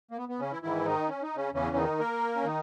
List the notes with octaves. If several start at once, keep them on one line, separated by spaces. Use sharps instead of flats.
A#3
B3
B3
C#3 C#4
E3 E4
G#2 D#3 E3 E4
D#3 D#4
C#4
D#4
C#3 C#4
E2 C#3 E3 C#4
D#3 D#4
A#3 A#4
C#4
D#3 D#4